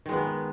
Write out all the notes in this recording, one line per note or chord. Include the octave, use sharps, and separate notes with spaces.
D#3 G#3 B3